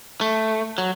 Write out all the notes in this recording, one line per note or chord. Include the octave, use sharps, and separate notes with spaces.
A3
F#3